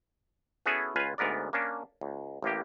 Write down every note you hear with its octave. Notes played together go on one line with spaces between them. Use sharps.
B3 C#4 E4 F#4 G#4 A4
C#2 F4 B4 F5 G#5
D2 G#2 B3 A#4 D5
A#3 C#4 D4
C#2
A1 A2 A#3 G4